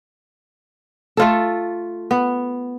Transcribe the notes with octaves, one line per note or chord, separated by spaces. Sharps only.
A3 F4 A4
B3